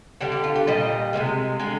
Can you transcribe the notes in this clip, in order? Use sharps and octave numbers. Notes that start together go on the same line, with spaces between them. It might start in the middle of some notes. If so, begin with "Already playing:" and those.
D3 G3 G4
G4
F4
G4
A#2 G3 D#5
C3 F3 G#3
D3 G#3